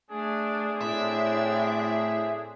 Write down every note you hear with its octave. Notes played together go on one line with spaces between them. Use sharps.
A3 D4 G#4
A2 C4 D4 E5